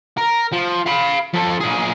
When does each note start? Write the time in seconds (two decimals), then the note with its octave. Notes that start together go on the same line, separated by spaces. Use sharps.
0.17 A#4
0.53 F3
0.86 F5 B5
1.34 F3 A4
1.61 A#2 G#4